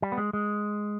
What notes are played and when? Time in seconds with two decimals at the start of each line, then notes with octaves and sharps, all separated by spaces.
0.02 G3
0.12 B3
0.18 G#3
0.33 G#3